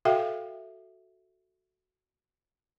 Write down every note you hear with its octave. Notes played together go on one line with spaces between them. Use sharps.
F#4 A4 E5 F5 G5